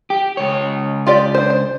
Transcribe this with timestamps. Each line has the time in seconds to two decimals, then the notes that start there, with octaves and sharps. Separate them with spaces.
0.10 G4
0.37 C#2 C#5
1.07 F4 G4 D5
1.35 D4 C5
1.50 C5